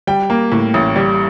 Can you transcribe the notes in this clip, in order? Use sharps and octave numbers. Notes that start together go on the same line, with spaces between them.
G3 G5
A#3
A2
A1
G3